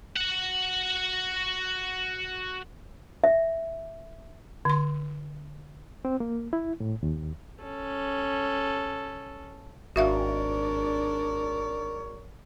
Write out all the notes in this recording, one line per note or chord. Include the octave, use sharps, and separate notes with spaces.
F#4 F#5
E5
D3 C6
C4
A#3
E4
A2
D#2
C#4 A4
G#1 D4 F#4 A#4 C#5 D5 E5 F5